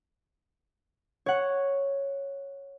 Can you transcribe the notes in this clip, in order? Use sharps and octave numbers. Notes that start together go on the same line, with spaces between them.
C#5 F#5